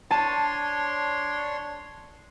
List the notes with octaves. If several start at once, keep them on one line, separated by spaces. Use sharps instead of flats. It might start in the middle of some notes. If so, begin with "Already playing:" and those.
D4 C#5 A5 C6 D#7